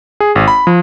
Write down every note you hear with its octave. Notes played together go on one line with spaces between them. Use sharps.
G#4
G#1
B5
F3